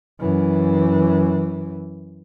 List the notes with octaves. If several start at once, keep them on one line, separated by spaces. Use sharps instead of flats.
F#2 E3